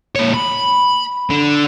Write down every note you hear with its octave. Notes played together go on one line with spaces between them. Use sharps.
A#2 C#5
B5
D3